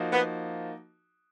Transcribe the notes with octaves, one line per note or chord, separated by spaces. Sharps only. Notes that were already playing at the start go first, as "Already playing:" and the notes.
Already playing: F3 A#3 D#4 F#4
B3